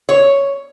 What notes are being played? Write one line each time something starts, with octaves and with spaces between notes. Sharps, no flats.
C#5